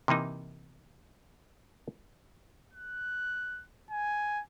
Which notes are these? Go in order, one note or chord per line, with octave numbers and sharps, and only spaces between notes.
C3 E3 A#3 D#4
F#6
G#5